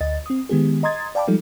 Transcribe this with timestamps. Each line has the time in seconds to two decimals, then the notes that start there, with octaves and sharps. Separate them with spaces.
0.01 D2 D#5 A6
0.26 C4 D#6
0.49 D#3 G#3 B3 G4 G#4
0.83 D#5 A#5 C6 D#6 G#6 A6
1.15 D5 F5 G5 A5 B5 D6
1.28 F3 G3 G#3 D#4 A4